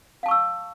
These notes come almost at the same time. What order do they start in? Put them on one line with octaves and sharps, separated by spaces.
F5 A5 C#6 E6